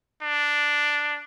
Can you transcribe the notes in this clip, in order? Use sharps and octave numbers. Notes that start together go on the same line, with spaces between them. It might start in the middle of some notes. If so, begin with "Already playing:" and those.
D4